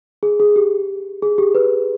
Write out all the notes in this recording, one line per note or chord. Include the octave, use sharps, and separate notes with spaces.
G#4
G#4
G4
G#4
G4
B4